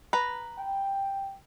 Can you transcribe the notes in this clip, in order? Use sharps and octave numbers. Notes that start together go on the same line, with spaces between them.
B4 A#5
G5